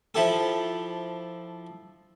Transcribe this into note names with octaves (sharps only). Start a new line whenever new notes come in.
F3 E4 G4 A4